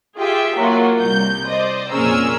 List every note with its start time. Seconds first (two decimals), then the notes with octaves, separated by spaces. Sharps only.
0.19 F4 G4 G#4 E5
0.56 F#3 A#3 F4 F#4
1.00 C2 G6
1.47 C5 D5 D#5
1.90 F2 A#2 C#4 G#4 A#4 E6